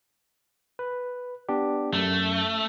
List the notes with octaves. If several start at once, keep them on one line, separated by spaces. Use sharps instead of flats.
B4
B3 D4 G4
F#2 A3